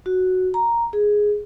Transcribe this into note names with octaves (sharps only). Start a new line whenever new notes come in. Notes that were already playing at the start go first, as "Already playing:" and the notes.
F#4
A#5
G#4